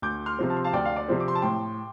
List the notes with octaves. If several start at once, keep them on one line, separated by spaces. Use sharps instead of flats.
D2 D6 G6
C6 F6
C3 F3 C4
A5
C6
F5 A5
D2 D5 G5
F5
D5
C3 F3 C4
D6
C6
A5
A2 G5 C6